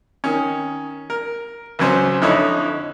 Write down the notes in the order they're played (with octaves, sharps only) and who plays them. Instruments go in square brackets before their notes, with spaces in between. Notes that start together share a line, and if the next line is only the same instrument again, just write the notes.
[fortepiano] D#3 C#4
A#4
C#2 F#3 C#4 C5
F2 D3 D#4 E4 C#5